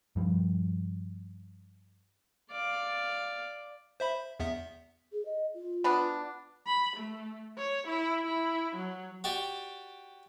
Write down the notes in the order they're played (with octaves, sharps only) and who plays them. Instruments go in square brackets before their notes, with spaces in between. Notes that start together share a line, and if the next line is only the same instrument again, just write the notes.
[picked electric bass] G2 F3 G3
[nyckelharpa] D5 F5
[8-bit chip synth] C5 E5 B5
E2 B3 E5
[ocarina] G#4
D#5
F4
[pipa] B3 D4
[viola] B5
A3
C#5
E4
E4
F#3
[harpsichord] F#4 G4 D5